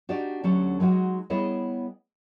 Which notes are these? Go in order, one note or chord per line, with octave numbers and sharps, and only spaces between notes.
D4 D#4 F#4 G4 D5
D2 F#3 C#4 D4 G4 A4
F#3 G#3 D#4 F#4
G3 B3 E4 G#4 C#5 D#5